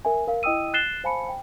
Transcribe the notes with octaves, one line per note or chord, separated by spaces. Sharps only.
A#4 E5 G#5
A#4 F5
E4 D#5 G5 D#6 E6 D#7
F#6 A6 C7 E7 G7
C5 F5 G#5 A5 B5 C#7
G5